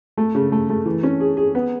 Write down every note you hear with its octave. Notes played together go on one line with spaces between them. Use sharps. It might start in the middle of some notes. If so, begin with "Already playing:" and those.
A3
C#3
A3
A3
E3
C#4
G#4
G#4
B3